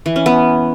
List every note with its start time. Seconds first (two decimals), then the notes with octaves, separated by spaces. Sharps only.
0.06 E3
0.16 C#4
0.26 B3